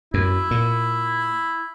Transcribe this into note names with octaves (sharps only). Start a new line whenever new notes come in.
F#2 E4
A#2